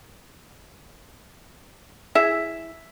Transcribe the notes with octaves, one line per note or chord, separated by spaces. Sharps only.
E4 G#4 E5